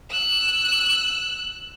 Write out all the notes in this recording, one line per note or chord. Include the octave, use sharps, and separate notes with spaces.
E6 F#6